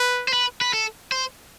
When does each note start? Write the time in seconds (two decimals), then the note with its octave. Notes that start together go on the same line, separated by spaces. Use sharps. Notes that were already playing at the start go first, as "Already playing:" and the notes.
Already playing: B4
0.28 C5
0.33 B4
0.61 B4
0.73 A4
1.12 C5